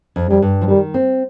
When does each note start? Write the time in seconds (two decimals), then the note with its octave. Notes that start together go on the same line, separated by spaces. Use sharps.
0.16 F2
0.29 F2 G3
0.42 G2
0.61 F3
0.68 D#3 G3
0.94 C4